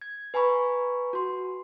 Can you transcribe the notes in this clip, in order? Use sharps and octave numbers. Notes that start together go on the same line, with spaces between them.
G#6
B4 G#5 A#5 B5 C#6
F#4 C6